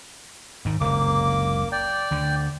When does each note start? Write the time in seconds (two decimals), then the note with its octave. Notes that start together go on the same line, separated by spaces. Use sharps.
0.65 G#2 D#3
0.81 F#1 C#2 C3 A#3 D6
1.72 D5 G5
2.11 D2 D3